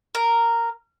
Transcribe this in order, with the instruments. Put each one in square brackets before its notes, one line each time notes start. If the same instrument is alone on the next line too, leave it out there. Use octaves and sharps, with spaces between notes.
[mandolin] A#4